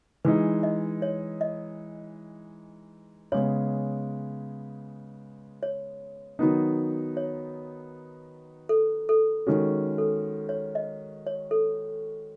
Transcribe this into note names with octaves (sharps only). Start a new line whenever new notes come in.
E3 G#3 D#4 B4
D#5
C#5
D#5
C#3 G#3 B3 C#5
C#5
D#3 F#3 B3 D#4
C#5
A4
A4
D#3 G#3 C#4 F#4
A4
C#5
D#5
C#5
A4